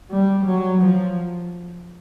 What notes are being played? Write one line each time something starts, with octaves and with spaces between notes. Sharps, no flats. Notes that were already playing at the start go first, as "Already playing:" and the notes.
G3
F#3
F3